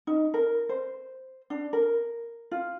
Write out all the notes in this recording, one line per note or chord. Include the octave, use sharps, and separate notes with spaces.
D#4
A#4
C5
D4
A#4
F4